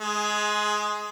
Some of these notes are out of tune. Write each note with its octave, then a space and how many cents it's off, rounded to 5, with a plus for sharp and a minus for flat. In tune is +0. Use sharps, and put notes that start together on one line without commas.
G#3 +20 G#4 +0